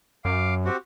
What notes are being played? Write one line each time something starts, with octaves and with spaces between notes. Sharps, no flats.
F#2 F5 D6
C4 F#4 G4